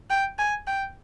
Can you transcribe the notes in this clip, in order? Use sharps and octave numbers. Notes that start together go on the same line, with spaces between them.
G5
G#5
G5